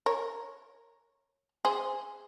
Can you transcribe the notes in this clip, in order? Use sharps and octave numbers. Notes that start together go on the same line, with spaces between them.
A#4 C#5
G#4 C5